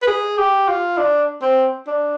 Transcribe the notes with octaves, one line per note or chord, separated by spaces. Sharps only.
B4
G#4
G4
F4
D4
C4
D4